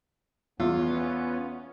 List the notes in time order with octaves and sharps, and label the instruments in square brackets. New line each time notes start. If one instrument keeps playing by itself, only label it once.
[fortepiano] E2 [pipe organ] B3 C#4 [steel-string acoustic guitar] F4